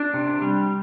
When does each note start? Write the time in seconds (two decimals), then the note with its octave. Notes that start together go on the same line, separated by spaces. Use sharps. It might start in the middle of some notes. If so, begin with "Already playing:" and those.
Already playing: D4
0.14 C3
0.42 G3